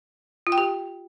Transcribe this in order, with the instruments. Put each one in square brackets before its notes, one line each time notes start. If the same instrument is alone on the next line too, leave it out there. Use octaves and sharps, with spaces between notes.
[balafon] F4
G5
G4